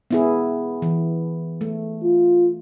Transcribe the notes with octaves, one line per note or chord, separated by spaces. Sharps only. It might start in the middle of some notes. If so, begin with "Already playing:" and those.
B3 E4 G#4
E3
A3
F4